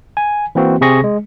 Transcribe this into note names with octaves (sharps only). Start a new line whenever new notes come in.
G#5
E3 A#3 C4 F#4
C3 C4 G#4 C#6 A#6
G#3